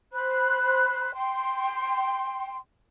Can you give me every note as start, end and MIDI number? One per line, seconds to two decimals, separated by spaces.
0.12 1.11 72
0.12 1.11 83
0.12 1.11 90
1.13 2.56 79
1.13 2.56 84